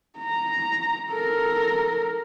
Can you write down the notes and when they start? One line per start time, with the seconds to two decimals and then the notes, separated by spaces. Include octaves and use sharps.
0.19 A#5
1.10 A4 A#4